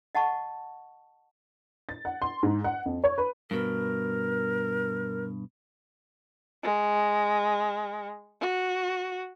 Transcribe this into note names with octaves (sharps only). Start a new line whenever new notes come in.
D#5 F#5 A5 C#6
A6
F#5
C6
G#2
F#5
F2
C#5
B4
G2 B2 A#4
G#3
F#4